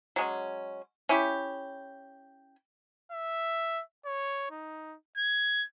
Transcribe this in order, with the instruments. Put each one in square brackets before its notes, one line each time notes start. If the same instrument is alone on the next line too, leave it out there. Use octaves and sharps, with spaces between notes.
[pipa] F#3 G#3 C#4
C#4 E4 G4
[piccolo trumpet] E5
C#5
D#4
G#6